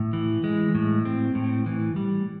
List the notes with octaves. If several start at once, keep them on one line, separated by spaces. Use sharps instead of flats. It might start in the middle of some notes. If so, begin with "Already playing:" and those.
Already playing: A2
E3
G#3
A2
C4
A2
E3
G3